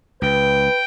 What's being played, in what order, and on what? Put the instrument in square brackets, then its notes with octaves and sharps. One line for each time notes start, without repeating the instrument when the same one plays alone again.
[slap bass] C#2 [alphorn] B4 [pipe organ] G5